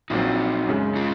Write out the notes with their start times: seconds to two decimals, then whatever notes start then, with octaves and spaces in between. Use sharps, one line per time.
0.10 A#1 A#2 F#3 C4 D#4 F#4
0.68 F#2 C#3 G#3
0.96 C#4 F4